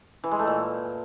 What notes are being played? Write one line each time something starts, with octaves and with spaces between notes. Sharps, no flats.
E3
G#3
A3
A#2